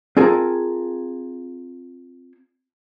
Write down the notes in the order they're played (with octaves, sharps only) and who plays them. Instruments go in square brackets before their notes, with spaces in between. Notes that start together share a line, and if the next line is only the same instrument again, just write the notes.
[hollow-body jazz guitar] C4 F4 G#4 A#4 A5